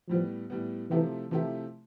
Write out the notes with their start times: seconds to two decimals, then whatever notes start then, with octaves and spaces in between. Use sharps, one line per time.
0.09 A2 F3 G3 B3
0.50 A2 G3 B3
0.91 C3 E3 F3 A3 E4 G4
1.31 C3 E3 F3 A3 E4 G4